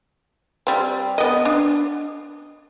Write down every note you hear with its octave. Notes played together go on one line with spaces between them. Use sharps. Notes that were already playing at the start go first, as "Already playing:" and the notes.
G3 C4
B3 D#5
D4